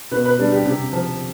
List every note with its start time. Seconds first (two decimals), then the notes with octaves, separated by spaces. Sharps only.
0.11 B2 B4
0.25 B4
0.39 G3 D4
0.52 G4
0.66 C3 G4
0.93 F3